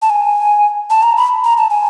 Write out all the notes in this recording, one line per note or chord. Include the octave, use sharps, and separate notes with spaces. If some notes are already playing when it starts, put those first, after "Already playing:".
A5
G#5
A5
A#5
B5
A#5
A5
G#5